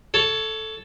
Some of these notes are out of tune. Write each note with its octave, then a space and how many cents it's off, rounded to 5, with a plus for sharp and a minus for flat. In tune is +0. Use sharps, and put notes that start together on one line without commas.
A4 +0 C#5 +15